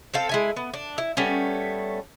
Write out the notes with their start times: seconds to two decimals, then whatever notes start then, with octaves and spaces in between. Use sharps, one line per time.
0.14 C4 A4 F5
0.29 G#3 E4 G#5
0.56 B3
0.74 D4
0.98 E4
1.17 G3 A3 B3 C#4